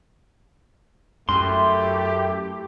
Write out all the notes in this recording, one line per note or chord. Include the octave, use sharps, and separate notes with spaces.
F#2 A3 E4 G4 C6